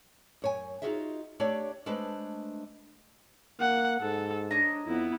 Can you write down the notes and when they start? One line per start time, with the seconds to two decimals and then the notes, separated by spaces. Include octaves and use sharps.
0.42 F#2 C#5 G#5
0.82 D#4 F4 F#4 G#4 D#5 E5
1.40 A3 D4 G4 C#5 D5
1.86 G#3 A3 D4 B4 C5
3.60 A#3 F#5
4.01 G#2 A4
4.51 D4 C#5 D#5 A#5
4.87 F2 B3 E4